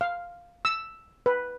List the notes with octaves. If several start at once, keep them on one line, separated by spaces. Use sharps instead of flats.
F5
E6
B4